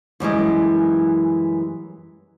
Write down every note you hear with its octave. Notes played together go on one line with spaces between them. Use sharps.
F#2 E3 G3 G#3